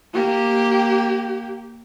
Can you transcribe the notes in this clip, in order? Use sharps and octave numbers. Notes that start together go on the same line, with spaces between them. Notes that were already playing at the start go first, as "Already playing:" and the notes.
A#3 G4